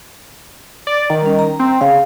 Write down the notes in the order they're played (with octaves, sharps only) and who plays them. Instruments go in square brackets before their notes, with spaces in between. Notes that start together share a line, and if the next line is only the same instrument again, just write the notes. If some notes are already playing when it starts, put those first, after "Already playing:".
[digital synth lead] D5
D#3
[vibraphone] G3 C#4
A#5
[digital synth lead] C4
[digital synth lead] C#3 [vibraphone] F5